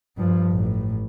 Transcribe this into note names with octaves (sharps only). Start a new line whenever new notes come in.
G2 F3
A1 A2